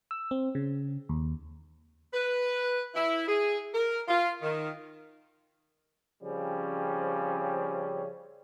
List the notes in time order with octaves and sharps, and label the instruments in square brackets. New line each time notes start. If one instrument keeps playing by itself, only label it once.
[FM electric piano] E6
C4
C#3
D#2
[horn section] B4
E4
G#4
A#4
F4
D#3
[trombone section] C#3 F3 G3 C4 C#4